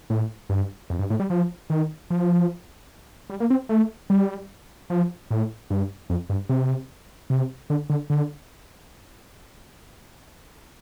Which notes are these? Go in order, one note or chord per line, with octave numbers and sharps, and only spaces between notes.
A2
G2
F2
G2
A2
G3
F3
D#3
F3
G3
A#3
C4
A3
G3
F3
A2
G2
F2
G2
C3
C3
D3
D3
D3